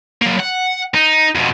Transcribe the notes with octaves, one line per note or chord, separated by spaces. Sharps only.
F#3 A#3
F#5
D#4
F2 B2